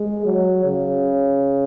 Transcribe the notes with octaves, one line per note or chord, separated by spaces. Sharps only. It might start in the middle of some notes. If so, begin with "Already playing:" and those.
Already playing: G#3
F#3
C#3